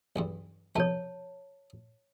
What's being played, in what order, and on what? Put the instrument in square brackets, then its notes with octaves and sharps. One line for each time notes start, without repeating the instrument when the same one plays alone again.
[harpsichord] B1 E2 G2
[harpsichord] C2 F2 B2 [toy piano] C#5 A5